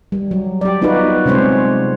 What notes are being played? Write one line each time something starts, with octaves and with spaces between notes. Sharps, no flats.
G3
F#3
G4 D5
B3 D#4 F4 F#4 B4
C3 G#3 C#4 C5 C#5